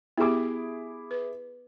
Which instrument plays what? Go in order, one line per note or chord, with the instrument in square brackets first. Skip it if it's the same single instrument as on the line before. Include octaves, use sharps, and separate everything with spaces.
[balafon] B3 G4 [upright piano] E4 G#4 D6
[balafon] B4